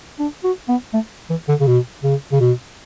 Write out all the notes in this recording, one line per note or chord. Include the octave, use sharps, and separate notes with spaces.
D4
F#4
B3
A3
E3
D3
C#3
B2
C#3
C#3
B2